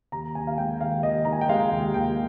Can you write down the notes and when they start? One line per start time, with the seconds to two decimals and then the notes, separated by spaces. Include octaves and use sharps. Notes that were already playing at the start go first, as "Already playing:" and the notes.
0.12 D#2 A#5
0.35 D#2 G#5
0.47 F5
0.58 G#3 G5
0.81 D#3 F5
1.03 D#2 D#5
1.25 D#3 A#5
1.33 G#5
1.41 G5
1.49 G#3 F5
1.71 D#2
1.94 D#2 G5